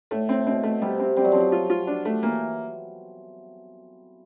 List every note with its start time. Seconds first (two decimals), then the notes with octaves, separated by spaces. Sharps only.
0.11 A2 A3
0.29 C4
0.47 B2 C4
0.63 A3
0.82 C3 G3
0.99 C4
1.16 G3 C4
1.24 F#3
1.32 F3 C4
1.41 F#3
1.52 F4
1.70 F4
1.87 D4
2.05 A3
2.23 E3 A#3